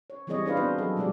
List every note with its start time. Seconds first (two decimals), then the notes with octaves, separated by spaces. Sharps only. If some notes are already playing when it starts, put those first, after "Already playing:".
0.10 C#5
0.27 E3 G3 C4 G#4 C#5 D#5
0.46 D4 G#4 B4 C5 F5
0.57 B3 C4 D4 D#4 F#4 C5
0.78 F#3 G#4 A4
0.96 B2 F3 G3 G#3 F#4 D5